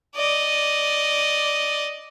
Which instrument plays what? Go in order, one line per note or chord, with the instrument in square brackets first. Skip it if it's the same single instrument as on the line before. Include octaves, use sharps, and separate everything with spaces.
[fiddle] D5 D#5